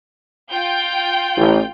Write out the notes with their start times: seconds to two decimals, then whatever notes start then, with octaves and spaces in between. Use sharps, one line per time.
0.50 F4 G5 G6
1.37 A1